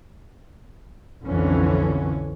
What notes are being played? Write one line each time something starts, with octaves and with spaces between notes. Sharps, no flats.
B1 F2 D3 E3 C#4